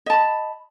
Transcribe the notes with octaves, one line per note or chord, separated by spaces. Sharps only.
D#5 A5 B5